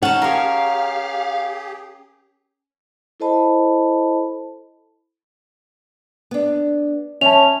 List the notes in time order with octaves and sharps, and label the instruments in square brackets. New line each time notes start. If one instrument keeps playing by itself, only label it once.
[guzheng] C#4 A5 [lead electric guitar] D#4 [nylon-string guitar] F#5
[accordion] G4 G#4 [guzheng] A#4 C#5 [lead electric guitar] F5
[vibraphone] E4 A4 C5 D#5 A5 B5
[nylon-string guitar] B3 D4
[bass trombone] C#4 [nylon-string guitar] E5 [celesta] A5 F7